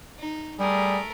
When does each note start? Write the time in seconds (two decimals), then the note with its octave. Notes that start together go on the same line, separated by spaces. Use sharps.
0.18 D#4
0.59 G3 A3 G#4 A#4